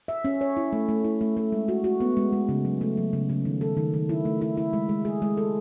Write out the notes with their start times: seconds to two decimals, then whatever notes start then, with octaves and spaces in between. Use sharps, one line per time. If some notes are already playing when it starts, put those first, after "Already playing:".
0.08 E5
0.25 C#4
0.41 C#5
0.57 E4
0.73 A3
0.88 A3
1.04 E4
1.21 A3
1.37 A3
1.52 G#3
1.68 F#4
1.84 F#4
2.00 B3
2.17 G#3
2.33 G#3
2.49 C#3
2.65 F#3
2.81 A3
2.98 F#3
3.13 C#3
3.29 C#3
3.45 D#3
3.61 A4
3.77 D#3
3.94 D#3
4.09 E4
4.25 A3
4.41 E4
4.57 E4
4.73 G#3
4.89 G#3
5.05 G#4
5.22 G#3
5.37 A4